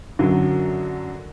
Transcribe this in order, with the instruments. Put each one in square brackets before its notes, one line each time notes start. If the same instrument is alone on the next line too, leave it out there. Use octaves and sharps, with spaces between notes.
[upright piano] F#2 D3 F#3